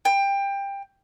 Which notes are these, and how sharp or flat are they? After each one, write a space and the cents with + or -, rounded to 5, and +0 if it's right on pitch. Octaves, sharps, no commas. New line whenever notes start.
G5 +20